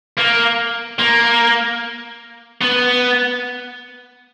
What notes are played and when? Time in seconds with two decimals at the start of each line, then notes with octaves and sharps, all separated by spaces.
0.18 A#3
0.99 A#3
2.61 B3